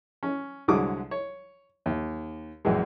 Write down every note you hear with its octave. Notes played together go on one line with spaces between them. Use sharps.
C#4
C2 D3 F#3 G#3 D6 D#6
C#5
D#2
A#1 F#2 E3 G#3